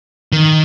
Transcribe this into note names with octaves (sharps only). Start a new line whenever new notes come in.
D#3